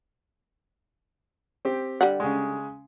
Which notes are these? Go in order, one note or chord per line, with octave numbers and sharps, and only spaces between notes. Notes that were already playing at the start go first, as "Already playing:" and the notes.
C4 G4
D3 G3 F#5
C#3 G#3